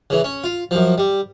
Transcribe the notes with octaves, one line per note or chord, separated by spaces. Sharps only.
C#3 E3
C#4
F4
F#2 F3
G3